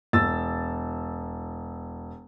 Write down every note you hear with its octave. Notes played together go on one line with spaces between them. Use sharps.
E1 E6 A6